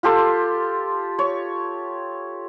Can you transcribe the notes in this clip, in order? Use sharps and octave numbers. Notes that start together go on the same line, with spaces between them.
F4 G4 A4 C6
C#5